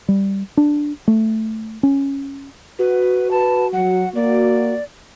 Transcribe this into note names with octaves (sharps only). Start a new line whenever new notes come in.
G3
D4
A3
C#4
F#4 B4
B4 A5
F#3 F#5
A#3 D5